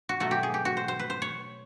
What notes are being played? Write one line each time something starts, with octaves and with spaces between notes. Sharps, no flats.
F#4
B2 F#3 A3 F#4
G4
G#4
G4
F#4
C5
C5
B4
C5
C#5